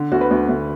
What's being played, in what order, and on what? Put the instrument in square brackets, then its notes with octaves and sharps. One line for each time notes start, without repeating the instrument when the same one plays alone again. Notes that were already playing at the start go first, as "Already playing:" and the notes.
Already playing: [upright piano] D3
D2 F#4
B4
D2
D2